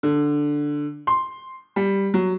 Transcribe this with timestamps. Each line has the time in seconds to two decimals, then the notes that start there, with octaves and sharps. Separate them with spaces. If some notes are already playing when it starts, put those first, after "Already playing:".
0.03 D3
1.07 C6
1.76 G3
2.14 F#3